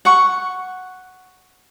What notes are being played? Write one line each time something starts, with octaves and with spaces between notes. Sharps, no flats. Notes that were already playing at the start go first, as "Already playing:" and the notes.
F#5 C#6